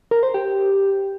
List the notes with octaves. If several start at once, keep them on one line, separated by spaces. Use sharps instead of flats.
A#4
C5
G4